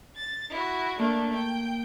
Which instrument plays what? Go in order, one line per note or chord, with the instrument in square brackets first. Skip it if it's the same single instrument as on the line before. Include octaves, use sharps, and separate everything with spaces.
[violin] A6
E4 F#4
[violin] A3 D4 [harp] A#3
[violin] G5